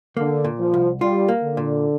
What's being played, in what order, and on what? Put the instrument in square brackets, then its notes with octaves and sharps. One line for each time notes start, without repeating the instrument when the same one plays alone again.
[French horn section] D3 [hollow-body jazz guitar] A#3
[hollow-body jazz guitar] A#2
[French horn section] F3
[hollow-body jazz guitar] C2
[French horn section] G3 [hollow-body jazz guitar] F4
[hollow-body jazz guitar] A#3
[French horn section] D3
[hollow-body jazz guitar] A#2